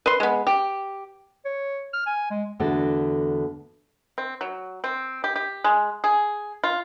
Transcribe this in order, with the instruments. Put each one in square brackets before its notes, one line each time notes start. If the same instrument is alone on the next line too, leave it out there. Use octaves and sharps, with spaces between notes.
[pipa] B4 C6
G#3 B3
G4
[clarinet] C#5
F6
G#5
G#3
[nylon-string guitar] E2 D3 A3 F#4 A4
[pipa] C4
F#3
C4
G4
G4
G#3
G#4
F4